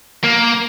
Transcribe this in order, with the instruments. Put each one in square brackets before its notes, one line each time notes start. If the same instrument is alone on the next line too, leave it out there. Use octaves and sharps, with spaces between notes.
[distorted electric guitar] A#3